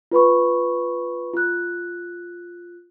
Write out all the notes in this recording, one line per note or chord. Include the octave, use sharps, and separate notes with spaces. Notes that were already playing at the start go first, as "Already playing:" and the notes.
F4 B4 B5 C#6
F4 F#6